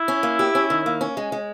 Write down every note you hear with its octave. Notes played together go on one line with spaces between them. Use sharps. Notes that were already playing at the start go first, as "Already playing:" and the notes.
Already playing: E4
C#4
A#3
G4
C#4
D#3
A#3
C#4
G#3
G#3